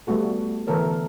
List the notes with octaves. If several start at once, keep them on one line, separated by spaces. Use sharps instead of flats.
G3 A3 B3 F#4 A4
D3 E3 B3 A4 A#4 C#5